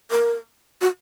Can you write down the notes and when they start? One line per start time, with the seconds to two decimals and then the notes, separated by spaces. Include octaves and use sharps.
0.11 A#4
0.81 F#4